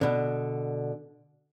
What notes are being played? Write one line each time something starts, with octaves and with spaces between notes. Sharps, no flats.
B2 D3